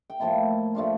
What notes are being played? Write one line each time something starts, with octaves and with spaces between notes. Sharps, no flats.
G5
A2 F3 A#3 E4 A5
F3 A3 D4 F4